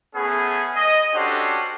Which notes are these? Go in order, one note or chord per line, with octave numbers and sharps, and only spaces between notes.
A3 B3 C#4 G#4
D#5
C#4 D4 F#4 G4 A4 C5